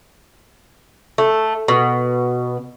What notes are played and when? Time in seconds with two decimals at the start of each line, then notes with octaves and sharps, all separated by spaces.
1.18 A3
1.68 B2